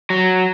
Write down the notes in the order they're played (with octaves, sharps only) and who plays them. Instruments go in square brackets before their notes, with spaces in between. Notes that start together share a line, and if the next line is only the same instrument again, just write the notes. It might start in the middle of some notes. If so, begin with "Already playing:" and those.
[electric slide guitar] F#3